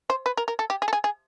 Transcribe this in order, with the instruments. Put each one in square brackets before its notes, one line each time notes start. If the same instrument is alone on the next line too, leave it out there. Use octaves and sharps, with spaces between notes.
[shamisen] C5
B4
A#4
A#4
A4
G4
G#4
A4
G#4
G#4